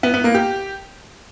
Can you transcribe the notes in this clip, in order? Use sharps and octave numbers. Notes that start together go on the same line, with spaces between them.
B3
B3
A#3
G4